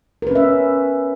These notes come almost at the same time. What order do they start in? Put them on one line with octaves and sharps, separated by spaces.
A#4 B4 C#4 E5